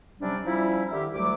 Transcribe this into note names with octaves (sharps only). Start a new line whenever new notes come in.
C3 F#3 G3 C#4 D4
F3 G3 C#4 D#4 E4
D3 D#3 G4 E5
D2 F#3 G3 A3 D6